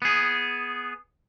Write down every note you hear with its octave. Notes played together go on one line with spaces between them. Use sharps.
B3 G#4